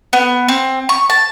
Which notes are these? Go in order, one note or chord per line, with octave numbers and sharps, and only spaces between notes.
B3
C4
C#6
A5